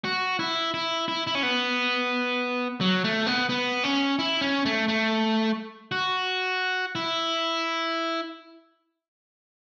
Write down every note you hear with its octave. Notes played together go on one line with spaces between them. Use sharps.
F#4
E4
E4
E4
E4
C#4
B3
F#3
A3
B3
B3
C#4
E4
C#4
A3
A3
F#4
E4